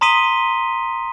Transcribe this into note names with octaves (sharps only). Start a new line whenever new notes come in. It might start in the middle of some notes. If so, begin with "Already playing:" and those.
A#5 C6 D#6 B6 D#7 G7